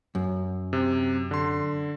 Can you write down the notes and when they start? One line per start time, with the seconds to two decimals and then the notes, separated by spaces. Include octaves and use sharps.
0.15 F#2
0.73 C3
1.31 D3 C6